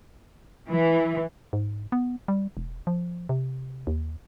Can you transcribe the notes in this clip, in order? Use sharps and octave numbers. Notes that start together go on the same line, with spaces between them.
E3
G#2
B3
G3
E1
F3
C3
D#2